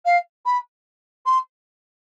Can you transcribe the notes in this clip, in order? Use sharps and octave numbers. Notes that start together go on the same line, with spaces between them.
F5
B5
C6